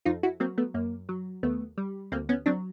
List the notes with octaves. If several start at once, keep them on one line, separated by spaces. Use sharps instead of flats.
F2 D#4 F4
E4 F#4
F#3 A#3 C4
A3 B3
F#2 A#3
F#3
D#2 A3 B3
G3
D2 A#3 C4
B3 C#4
F#3 C4 D4